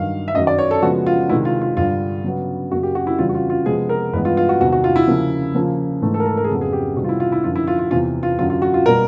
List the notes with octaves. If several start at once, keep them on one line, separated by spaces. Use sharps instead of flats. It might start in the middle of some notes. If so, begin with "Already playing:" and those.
Already playing: G2 D#3 F#3 F5
E5
F#2 D#3 F#3 D#5
D5
C#5
A4
C#3 F3 G#3 B3 F#4
F4
C3 D#3 G#3 E4
F4
F4
G2 D3 G3 F4
C#3 F#3 B3
F#2 C#3 F#3 A#3 F#4
G4
F#4
E4
F2 C#3 E3 G3 F4
F#4
F4
F4
C3 F3 G#3 B3 G#4
A#4
G2 E3 G#3 B3 B4
F4
F4
F#4
E2 C3 D#3 F#4
F#4
F4
E4
C#3 F3 A#3
C#3 F3 A#3
G#2 E3 A3
A4
A#4
A4
A#4
G#4
F2 C#3 F#3 B3 A4
G#4
G4
C3 D#3 G3 B3 F#4
F4
E4
F4
E4
F#2 D3 F3 F4
E4
F4
F4
E2 C3 E3 F4
F4
F#2 D3 F#3 F4
F4
F#4
F4
B2 G3 A#3 A#4